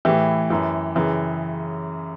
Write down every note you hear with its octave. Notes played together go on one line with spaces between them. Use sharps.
A2 E3 E4 G4
F#2 E3
F#2 C#3 E3